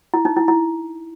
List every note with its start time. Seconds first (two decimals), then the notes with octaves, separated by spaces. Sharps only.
0.14 E4
0.25 D#4
0.37 E4
0.48 E4